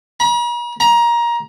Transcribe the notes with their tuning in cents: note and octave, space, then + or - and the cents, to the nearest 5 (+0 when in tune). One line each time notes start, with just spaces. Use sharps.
A#5 +45
A#5 +20